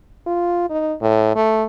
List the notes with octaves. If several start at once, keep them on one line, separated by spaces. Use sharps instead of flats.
F4
D#4
A2
A3